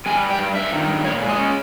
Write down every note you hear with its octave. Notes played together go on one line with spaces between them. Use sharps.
G3 G#5
G2
G5
G2
G2 E5
D#3
G2
A#2 C#5
G#3
D#5
C#4